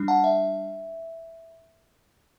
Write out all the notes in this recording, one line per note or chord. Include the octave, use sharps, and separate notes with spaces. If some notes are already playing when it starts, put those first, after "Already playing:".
Already playing: G3 D4
F#5 A5
E5